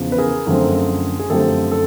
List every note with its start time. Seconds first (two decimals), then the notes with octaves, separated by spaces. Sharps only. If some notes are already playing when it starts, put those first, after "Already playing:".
Already playing: E2 C#3 F3
0.12 B4
0.18 G#4 A#4
0.47 F#2 D3 F3 A3 C4
1.19 G#4
1.30 F#2 D3 F3 A3 C4 G4 A4
1.72 A4